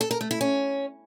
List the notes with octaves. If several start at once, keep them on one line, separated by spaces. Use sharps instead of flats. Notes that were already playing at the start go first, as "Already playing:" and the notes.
A4
A#4
A3
E4
C#4